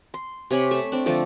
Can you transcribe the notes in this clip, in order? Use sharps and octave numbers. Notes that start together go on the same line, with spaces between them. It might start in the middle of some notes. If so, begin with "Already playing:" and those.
C6
C3 C#5 G#5 B5
A3 E5 C#6
C4 D4
D3 F3 A3 A4